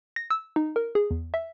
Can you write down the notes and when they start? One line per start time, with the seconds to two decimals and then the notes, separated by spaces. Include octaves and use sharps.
0.16 A#6
0.31 E6
0.56 D#4
0.76 A#4
0.95 G#4
1.11 E2
1.34 E5